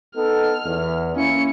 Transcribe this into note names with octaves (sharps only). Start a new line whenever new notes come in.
B3 D#4 A4 F6
E2
A#3 C#4 E4 C#7